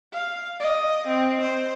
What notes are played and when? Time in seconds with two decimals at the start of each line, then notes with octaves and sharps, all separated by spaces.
0.13 F5
0.60 D#5
1.07 C4
1.41 C5